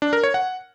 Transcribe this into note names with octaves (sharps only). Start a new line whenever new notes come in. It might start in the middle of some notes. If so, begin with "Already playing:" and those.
D4
A#4
C#5
F#5